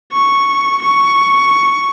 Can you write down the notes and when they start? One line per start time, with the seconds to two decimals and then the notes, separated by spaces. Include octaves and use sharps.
0.12 C#6
0.82 C#6